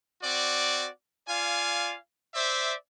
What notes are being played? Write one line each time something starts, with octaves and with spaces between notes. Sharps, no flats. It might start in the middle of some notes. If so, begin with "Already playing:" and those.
C4 F#4 D5
F4 D5 F5 G#5
C5 D5 E5